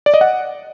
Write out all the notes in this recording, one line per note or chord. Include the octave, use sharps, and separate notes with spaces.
D5
D#5
F#5